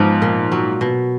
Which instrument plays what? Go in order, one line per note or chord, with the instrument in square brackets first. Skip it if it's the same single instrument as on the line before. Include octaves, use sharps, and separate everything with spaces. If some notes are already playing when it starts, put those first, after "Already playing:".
Already playing: [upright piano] G#2 [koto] F3 B3
[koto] A#2
F#3
B2